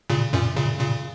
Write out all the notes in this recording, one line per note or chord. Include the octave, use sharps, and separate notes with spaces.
A#2 C#3
F#2 A#2
A#2 C#3
A#2 C#3